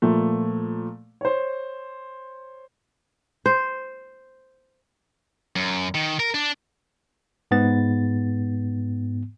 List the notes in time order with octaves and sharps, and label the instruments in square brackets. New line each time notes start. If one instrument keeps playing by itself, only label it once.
[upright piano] A#2 F3 A3
C5 C#5
[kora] C5
[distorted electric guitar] F#2
D#3
A#4
D4
[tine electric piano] G#2 B3 A6